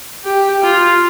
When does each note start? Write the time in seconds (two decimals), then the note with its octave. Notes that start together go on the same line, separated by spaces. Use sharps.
0.24 G4
0.63 F4